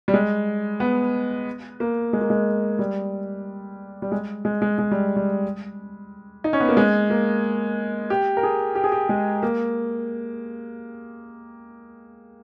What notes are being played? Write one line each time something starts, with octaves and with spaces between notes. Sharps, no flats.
G3
G#3
B3
A#3
G#3
A#3
G#3
G3
G3
G#3
G#3
G#3
G#3
G3
G3
D#4
C#4
B3
A#3
G#3
A#3
G4
A#4
G#4
G4
G#4
G4
G#3
A#3